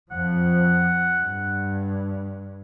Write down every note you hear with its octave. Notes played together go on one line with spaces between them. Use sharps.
F2 F3 F#5
G2